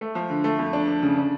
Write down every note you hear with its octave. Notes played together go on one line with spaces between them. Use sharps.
A3
F3
D3
A3
F2
D4
D4
C#3
D4